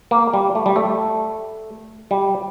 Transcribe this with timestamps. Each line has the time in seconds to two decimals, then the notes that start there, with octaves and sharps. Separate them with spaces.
0.11 A#3
0.33 G3
0.55 A3
0.66 G3
0.76 A3
2.11 G3